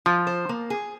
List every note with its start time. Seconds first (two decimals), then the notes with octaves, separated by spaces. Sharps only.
0.06 F3 F4
0.27 C5
0.49 A#3
0.70 G#4